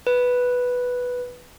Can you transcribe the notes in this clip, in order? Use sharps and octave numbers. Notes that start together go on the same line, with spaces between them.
B4